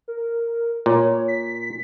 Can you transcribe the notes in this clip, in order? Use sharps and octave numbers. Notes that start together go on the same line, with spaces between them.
A#4
A#2 C#5
B6